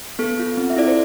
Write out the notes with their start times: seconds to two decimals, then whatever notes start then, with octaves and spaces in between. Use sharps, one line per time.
0.19 B3 A4
0.38 F4 A4
0.57 C4
0.70 E5
0.76 E4 A4 D5
0.88 C5